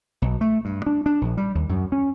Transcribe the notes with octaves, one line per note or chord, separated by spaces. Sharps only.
B1
A3
G2
D4
D4
A#1
G3
D#2
F#2
C#4